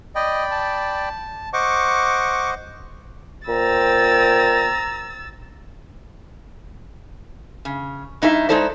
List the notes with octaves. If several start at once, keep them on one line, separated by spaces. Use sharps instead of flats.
D5 D#5 G5 B5
A5
C5 D#5 F#5 C#6 D6
A#2 C5 G5 A#5 E6 A6
C#3
G2 D#4 E4 G#4 E5
G#3 D#4 E4 A4 C5 D5